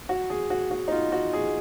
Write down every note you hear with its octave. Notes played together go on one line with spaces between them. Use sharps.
F#4
G#4
F#4
F#4
D#4
F4
F#4
G#4